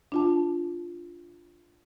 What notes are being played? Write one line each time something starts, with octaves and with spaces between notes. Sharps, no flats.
D4 F4 A5